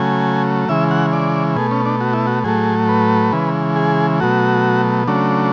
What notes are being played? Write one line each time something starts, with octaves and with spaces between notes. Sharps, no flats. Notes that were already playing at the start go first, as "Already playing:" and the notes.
Already playing: C#3 F#3 A3 G#5
C#3 E3 G#3 E5
F#5
D5
B2 A3 G#4
C#4
D4
F#4
E4
F#4
A2 F#3 A3 G#4
B4
C#3 E3 G#3
G#4
B2 F#3 A3 F#4
C#3 F#3 A3 D4